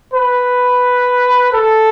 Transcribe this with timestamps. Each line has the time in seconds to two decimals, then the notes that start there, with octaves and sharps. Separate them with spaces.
0.14 B4
1.53 A4